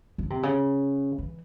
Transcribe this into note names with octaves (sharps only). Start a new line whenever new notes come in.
F3
C3
C#3
E3